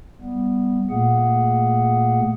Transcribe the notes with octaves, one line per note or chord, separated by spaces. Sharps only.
G3 B3
A#2 A3 A#3 G#4 F#5